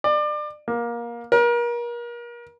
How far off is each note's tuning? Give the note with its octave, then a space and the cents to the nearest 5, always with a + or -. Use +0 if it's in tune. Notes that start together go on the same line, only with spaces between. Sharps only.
D5 +30
A#3 +20
A#4 +35